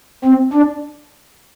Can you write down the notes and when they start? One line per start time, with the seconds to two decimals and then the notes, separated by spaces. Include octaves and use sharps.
0.25 C4
0.53 D4